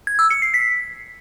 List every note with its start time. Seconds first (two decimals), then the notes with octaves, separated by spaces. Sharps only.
0.07 G#6
0.19 E6
0.30 C#7
0.42 C7
0.54 B6